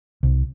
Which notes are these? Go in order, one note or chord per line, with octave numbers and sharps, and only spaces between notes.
C2